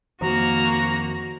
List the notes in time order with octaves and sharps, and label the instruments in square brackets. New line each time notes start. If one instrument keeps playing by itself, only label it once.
[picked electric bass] F2 D#3 F3 [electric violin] A#3 F#4 [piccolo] A#5